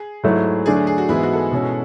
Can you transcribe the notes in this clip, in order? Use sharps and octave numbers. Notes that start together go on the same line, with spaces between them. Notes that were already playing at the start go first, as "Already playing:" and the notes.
Already playing: G#4
G#2 F#3 A3 E4
D3 F#3 A3 D4 G#4
G#4
G#4
F#4
G#2 E3 G#3 B3 E4
F#4
A4
G#4
B2 G#3 C#4